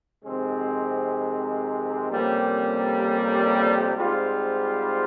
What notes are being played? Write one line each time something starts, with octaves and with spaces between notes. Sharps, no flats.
F2 C3 D#3 G#3 C4
F2 C3 G3 A#3 C#4
G#2 G3 C4 F4